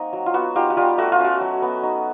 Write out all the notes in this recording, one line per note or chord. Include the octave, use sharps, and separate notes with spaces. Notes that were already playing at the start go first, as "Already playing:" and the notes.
Already playing: A#3 C4 D#4 F#4
F#3
F4
B3 F#4
D#4 F4 G4
F#4
G3 F4 G4
A3 F#4
F4
C#4 F#4
F#3
B3
D#4